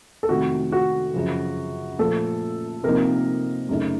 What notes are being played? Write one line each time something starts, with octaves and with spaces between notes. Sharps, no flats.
A4
F2 C3 D#3 A3 F#4
F#4
F#2 C#3 F3
A#2 F3 A3 A4
C3 F3 A#3 D#4 A#4
F#2 C#3 A3 D#4